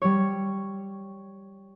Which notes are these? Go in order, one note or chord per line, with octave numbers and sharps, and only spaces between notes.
G3 C#5